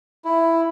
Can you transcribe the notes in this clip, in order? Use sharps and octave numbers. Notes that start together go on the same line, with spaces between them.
E4